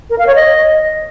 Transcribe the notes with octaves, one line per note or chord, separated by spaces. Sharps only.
A#4
F5
C#5
D#5